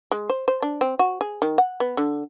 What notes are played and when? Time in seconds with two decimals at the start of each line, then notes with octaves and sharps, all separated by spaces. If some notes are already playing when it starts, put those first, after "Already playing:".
0.11 G#3
0.29 C5
0.48 C5
0.62 D4
0.81 C4
0.99 F#4
1.21 G#4
1.42 D#3
1.58 F#5
1.80 B3
1.97 D3